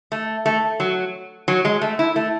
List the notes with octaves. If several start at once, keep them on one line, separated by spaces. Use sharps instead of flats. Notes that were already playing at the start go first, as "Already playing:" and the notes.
A3
A3
F#3
F#3
G#3
A3
E4
A3